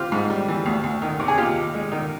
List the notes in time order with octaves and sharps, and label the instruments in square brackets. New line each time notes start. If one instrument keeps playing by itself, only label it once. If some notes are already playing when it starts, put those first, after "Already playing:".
Already playing: [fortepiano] C4 F4 G4
G#2
G3
E3
D2
D2
D#3
C3
G#4
D#2 F4 G4
D#2
G#3
D#3